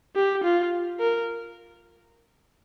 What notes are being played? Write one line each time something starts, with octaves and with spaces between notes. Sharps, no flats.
G4
F4
A#4